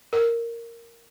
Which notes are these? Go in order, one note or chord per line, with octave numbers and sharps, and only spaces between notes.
A#4